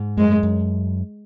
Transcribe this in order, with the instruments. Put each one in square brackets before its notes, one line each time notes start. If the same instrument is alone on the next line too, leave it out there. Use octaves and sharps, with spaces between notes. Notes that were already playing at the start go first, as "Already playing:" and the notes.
Already playing: [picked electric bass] G#2
[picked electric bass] F#2 [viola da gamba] G#3
[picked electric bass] F#2